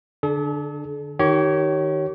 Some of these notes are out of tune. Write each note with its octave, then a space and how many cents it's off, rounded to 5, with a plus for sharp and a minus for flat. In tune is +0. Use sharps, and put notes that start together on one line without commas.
D3 +0 D4 +15 A4 -45
D#3 +0 G4 -35 C#5 +0